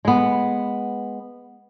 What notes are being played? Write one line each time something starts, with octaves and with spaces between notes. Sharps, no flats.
G#3 B3